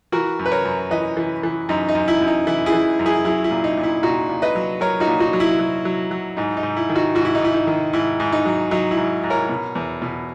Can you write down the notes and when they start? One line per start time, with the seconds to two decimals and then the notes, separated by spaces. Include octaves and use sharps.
0.12 E3 F#4 A#4
0.39 F#2
0.46 B4
0.52 A#4 C#5
0.65 F#2
0.91 E3 B4 D#5
1.17 E3
1.43 E3
1.69 F#2 D#4
1.89 D#4
1.95 F#2
2.08 E4
2.21 F#2
2.27 D#4
2.47 E3 E4
2.66 E4 G#4
2.73 E3
2.99 F#2
3.06 E4 G#4
3.25 F#3 E4 G#4
3.44 E4
3.51 A#2
3.64 D#4
3.77 A#2
3.83 E4
4.03 A#2 D#4 F#4
4.29 A#2
4.42 B4 D#5
4.55 F#3
4.81 F#3 A#4 C#5
5.00 D#4 F#4
5.07 A#2
5.20 D#4 F#4
5.33 F#3
5.40 E4
5.59 F#3
5.85 F#3
6.11 F#3
6.37 G#2 D#4
6.57 D#4
6.63 G#2
6.77 E4
6.89 D#3
6.95 D#4 F#4
7.15 G#2 F#4
7.25 E4
7.35 D#4
7.41 G#2 E4
7.54 D#4
7.67 D#3
7.93 G#2 E4
8.20 G#2
8.32 D#4
8.45 F#3
8.71 F#3 D#4
8.91 E4
8.97 G#2
9.24 G#2
9.30 A#4 C#5
9.49 B2
9.75 E2
10.02 B2